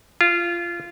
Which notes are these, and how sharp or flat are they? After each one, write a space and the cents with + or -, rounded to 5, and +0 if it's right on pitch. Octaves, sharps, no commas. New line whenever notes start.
F4 -20